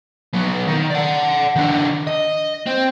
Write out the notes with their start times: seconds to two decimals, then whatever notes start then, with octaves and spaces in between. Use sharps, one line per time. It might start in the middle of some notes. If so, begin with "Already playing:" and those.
0.33 F#3 B3
0.68 D#3
0.90 D5 F#5
1.56 D#3 D4
2.07 D#5
2.66 C4